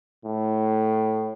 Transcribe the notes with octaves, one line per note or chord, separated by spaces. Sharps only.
A2